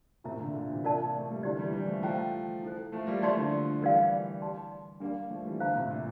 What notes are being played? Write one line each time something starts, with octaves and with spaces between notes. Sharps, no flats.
A2 C3 F4 A#4 E5 A#5
A#2 D3
A#2 D3
C3 E3
F4 A#4 D5 A5
A#3
A3
G3
D3 F3 E4 G4 D5
E3 G3
E3 G3
F3 A3
F3 A3 C5 G5 A#5
E4 A4 C5
F3 A3
G3 A#3
F3 A3 E4 G4 D5 A5 C6
D3 F3
E3 G3 A#4 D5 F5
G4 D5 A5 C6
G3 A#3 D4 G4 D5 F5
F3 A3
E3 G3
D3 F3 C5 F5 A#5
A2 C3
A#2